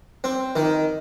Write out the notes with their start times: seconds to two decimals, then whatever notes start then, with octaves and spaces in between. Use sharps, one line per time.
0.24 C4
0.56 D#3